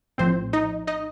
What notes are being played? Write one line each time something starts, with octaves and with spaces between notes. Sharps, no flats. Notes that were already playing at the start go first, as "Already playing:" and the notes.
A#1 A2 F3 C4 C5
D#4 D#5
D#4 D#5